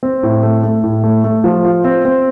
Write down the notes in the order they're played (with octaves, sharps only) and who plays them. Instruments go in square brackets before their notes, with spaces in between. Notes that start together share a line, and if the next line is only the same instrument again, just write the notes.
[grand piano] C4
A2
A3
A3
A2
A3
A3
F3
F4
C4
C4